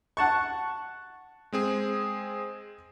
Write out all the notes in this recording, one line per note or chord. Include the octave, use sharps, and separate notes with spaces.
F#5 A5 C#6
G#3 C4 G#4